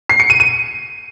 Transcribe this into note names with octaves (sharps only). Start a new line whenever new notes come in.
C7
C#7
D#7
D#7